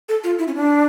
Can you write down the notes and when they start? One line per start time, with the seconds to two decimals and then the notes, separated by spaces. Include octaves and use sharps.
0.09 A4
0.24 F4
0.39 E4
0.48 C#4
0.55 D4